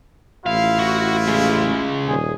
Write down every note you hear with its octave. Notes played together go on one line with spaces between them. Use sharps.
A1 E4 F4 F5
F#4
C#3 G#3
D#1 G#4